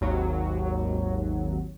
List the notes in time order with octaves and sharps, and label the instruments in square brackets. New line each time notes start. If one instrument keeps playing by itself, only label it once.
[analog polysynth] G#1 D#2 F#3